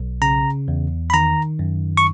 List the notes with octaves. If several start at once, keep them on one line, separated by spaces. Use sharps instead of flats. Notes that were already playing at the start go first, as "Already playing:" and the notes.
Already playing: B1
C#3 A#5
E2
B5
D#3 A#5
F#2
C#6